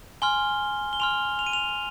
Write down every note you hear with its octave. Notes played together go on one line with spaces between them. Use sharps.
G#5 C6 F6 G7
G7
G#5 C6 F6 F7
F7
D#7
F7